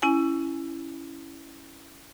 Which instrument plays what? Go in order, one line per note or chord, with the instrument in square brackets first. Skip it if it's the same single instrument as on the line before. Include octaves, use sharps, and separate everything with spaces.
[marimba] C#4 E4 G#5